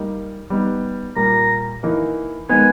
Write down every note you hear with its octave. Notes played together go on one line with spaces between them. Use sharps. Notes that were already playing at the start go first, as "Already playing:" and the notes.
Already playing: G3 A#3 D#4
G3 B3 D#4
A#2 G3 A#3 A#5
E3 A#3 D#4
D#3 G#3 B3 D#4 G#5